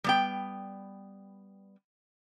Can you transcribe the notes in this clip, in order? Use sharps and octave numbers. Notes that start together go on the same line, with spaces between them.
G3 B3 G5